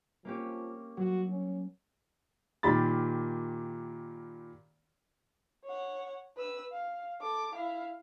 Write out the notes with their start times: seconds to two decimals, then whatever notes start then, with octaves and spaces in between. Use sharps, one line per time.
0.25 F3 A#3 C#4 G4
0.97 F#3 F#4
1.29 C#4
2.63 A#2 D#3 G4 B5 A6
5.65 C#5 F#5
6.37 B4 E6
6.72 F5
7.21 A4 D6
7.54 E4 F5